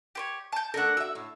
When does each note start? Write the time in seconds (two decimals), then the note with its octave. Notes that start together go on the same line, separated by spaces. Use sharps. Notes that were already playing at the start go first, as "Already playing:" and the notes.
0.15 G4 C5 C#5
0.52 A5 G6
0.74 A3 D4 A4 A#4 F#5
0.97 F#4 E5 E6
1.15 A2